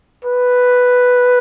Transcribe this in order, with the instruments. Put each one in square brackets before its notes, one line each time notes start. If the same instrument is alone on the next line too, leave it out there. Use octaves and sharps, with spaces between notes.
[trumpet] B4